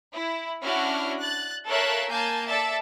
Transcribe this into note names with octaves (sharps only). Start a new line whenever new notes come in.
E4
C#4 D4 E4 F#4 F#5 F6
F#6 A6
A4 A#4 C#5 E5 F5 F#6
A#3 G#5 A5 G6
A4 D5 E5 A5